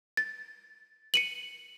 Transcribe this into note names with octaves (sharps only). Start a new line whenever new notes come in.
A6
C#7 D#7 F#7